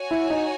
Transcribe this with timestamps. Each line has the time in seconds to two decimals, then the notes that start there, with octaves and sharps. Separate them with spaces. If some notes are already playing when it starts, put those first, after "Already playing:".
Already playing: F#4 C#5 G#5
0.11 E4
0.30 D#4